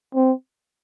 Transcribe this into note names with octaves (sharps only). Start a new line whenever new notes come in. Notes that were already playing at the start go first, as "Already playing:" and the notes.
C4